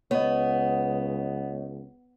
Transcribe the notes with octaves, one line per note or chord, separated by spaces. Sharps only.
C#2 B3 C#5 D#5